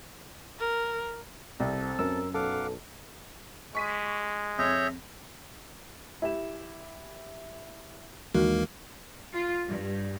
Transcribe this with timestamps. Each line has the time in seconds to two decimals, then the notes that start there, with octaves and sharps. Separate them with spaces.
0.59 A#4
1.60 C2 C4 A4
1.99 F#2 A#4 E6
2.34 B1 A4 F5 F#5 D6
3.75 G#3 C#6 B6 D#7
4.58 F2 G#4 C#5 E5 G6 A#6
6.22 E4 G4 E7
8.35 D#2 D#3 E3 G#3 A#3 F#4
9.34 F4
9.65 G2